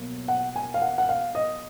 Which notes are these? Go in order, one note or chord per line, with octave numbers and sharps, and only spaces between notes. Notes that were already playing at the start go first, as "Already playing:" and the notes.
Already playing: B2 F#3 A#3
F#5
G#5
F5
F#5
F#5
F5
D#5